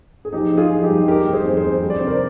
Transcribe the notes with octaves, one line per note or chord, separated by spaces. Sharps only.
G#4
F3 D#4 G4
F3
F4 G#4
F3
D#4 G4
G2
G#3 G4 A#4
D#3
G#4 C5
F2
G#4 C5
F2
G3
D5
C3 C5
A#4 D5